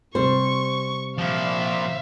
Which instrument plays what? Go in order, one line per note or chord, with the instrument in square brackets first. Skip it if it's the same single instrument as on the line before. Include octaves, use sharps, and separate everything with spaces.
[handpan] C3 C4 [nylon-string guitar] G3 C5 [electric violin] C#6
[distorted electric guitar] A#2 F3 [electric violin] E5 F5